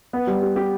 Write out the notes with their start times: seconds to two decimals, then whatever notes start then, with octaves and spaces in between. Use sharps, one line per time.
0.13 B3
0.27 G3
0.42 G4
0.56 G4